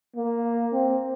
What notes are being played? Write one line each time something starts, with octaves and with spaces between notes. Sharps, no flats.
A#3
C4